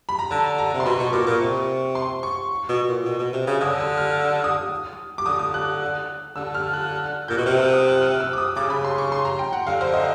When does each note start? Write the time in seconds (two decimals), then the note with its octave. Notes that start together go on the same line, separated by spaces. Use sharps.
0.09 B5
0.19 A#5
0.31 D3 A5
0.58 A#5
0.74 C3
0.80 C6
0.85 B2 B5
0.99 B2 C#6
1.13 A#2 D6
1.27 A#2 C#6
1.41 C3
1.95 C6
2.23 C#6
2.69 B2
2.88 A#2
3.05 B2
3.20 B2
3.33 C3
3.47 C#3
3.61 D3 D#6
3.80 E6
3.98 F6
4.44 D#6
5.18 D6
5.26 D3 D#6
5.39 D#6
5.54 F#6
6.36 D3 E6
6.54 F6
6.74 F#6
7.28 A#2 G6
7.37 B2 F#6
7.46 C3 F6
7.60 E6
7.73 D#6
7.88 F#6
8.01 F6
8.20 E6
8.33 D6
8.38 D#6
8.56 C#3 D6
8.70 B5
8.84 C6
8.98 C#6
9.12 C6
9.25 A#5
9.39 G5
9.53 F#5
9.67 D3 F5
9.81 C5
9.93 D#5